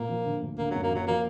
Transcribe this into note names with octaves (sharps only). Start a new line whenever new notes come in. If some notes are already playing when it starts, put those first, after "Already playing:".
Already playing: A#2 A#3
F3
D3
D2
D3 A#3
F#3
F#2
A#3
F#1 F#3
F3 A#3